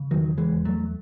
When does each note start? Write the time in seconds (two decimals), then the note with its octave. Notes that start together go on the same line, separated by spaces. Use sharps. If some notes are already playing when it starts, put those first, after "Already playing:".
Already playing: C#3
0.11 E2 D#3 F#3
0.38 E3 G#3
0.52 E2
0.65 F#3 A3